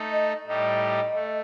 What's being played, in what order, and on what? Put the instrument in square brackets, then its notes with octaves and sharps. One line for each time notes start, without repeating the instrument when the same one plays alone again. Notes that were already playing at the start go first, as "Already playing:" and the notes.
Already playing: [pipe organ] A3 D#4 A4
[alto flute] D#5
[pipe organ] A2 G3 D#4 G4 [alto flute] D#5
[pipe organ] A3